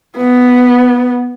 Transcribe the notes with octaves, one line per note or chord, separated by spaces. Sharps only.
B3